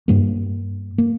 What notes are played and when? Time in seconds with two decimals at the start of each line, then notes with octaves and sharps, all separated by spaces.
0.08 G2 G3 A#3
0.98 A#3